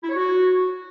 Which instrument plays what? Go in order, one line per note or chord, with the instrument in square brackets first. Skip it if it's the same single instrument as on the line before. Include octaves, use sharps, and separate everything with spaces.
[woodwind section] E4
C#5
F#4